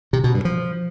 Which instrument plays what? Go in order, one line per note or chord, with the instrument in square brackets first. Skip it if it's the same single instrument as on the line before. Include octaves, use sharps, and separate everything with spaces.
[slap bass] C3
B2
G2
F3